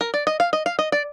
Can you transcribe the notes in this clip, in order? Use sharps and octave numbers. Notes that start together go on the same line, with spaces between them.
A#4
D5
D#5
F5
D#5
F5
D#5
D5